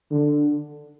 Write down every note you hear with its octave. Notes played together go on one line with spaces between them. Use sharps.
D3